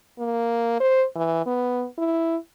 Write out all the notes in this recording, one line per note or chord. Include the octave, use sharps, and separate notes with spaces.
A#3
C5
E3
B3
E4